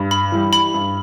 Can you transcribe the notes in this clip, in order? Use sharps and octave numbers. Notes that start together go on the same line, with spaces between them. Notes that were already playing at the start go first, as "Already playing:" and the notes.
Already playing: G2
B5
E3 G3
B5
G2